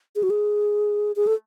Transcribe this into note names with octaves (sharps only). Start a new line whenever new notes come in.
G#4
F#4
G#4
G#4
A4